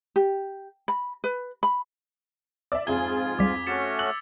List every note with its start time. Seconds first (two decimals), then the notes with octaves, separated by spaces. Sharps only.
0.16 G4
0.88 B5
1.24 B4
1.63 B5
2.72 D5 E5 D6 E6
2.87 F2 G#2 F4 G#4 G#5 G#6 G7
3.39 C#2 G3 D6 B6
3.67 A3 C#4 F#4 D6 A6 C#7 E7
3.99 E6 F#6 F#7